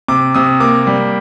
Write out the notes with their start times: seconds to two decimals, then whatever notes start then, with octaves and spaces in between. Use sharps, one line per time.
0.08 C3 D6
0.34 C3 D#6
0.60 A#3 D6
0.87 G3